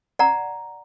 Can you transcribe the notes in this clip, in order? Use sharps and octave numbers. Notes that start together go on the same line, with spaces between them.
D5 F#5 A#5